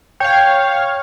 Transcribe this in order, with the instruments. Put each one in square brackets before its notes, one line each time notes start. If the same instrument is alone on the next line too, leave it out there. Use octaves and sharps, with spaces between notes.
[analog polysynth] C#5 F5 [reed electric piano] G5 G6